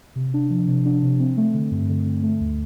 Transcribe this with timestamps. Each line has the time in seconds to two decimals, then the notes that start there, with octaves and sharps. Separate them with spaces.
0.16 C3
0.34 D4
0.50 F3
0.68 C3
0.86 D4
1.02 C3
1.20 C4
1.37 A3
1.54 D3
1.71 G2
1.89 D3
2.05 D3
2.23 A3
2.40 D2